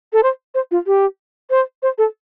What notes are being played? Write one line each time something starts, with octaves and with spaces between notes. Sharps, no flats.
A4
C5
C5
F4
G4
C5
C5
A4